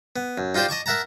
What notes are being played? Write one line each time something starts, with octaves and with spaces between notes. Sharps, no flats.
B3
F#2
D#4 F4 G4 C5 D5
D#5 A5 C#6 D6
A#4 E5 F#5 A5 A#5